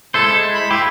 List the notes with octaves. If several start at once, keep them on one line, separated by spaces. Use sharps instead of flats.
G#3 E4 A4 C5
B5
E4 F4 G4